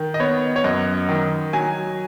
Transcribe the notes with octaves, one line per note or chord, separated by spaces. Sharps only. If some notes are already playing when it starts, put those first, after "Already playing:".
Already playing: D#3
D#5
B3 C#5
C#5
F#2 D#5
D#3
F#3 G#5